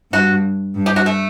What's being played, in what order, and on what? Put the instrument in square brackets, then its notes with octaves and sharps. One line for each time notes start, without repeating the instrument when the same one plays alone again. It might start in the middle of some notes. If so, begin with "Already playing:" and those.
[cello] G2 [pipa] F#4
[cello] G2
[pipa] G4
F#4
A3